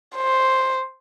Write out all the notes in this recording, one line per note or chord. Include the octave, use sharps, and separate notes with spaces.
C5